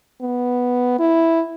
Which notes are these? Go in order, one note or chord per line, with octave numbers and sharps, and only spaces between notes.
B3
E4